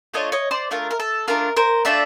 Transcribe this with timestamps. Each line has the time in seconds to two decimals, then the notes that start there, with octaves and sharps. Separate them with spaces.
0.14 A3 D4 F4 C#5 D#5
0.32 C#5 D#5
0.51 C5 D5
0.71 A3 D4 F4 A#4
0.91 A#4
1.00 A4
1.28 A3 D4 F4 A#4
1.57 A#4 C5
1.85 A3 D4 F4 D5 E5